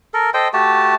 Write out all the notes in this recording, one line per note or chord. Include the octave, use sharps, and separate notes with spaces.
A4 A#4
A4 C5 D#5 G5
A3 F#4 G4 A5